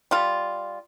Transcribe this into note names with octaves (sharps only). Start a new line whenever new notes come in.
G3 F4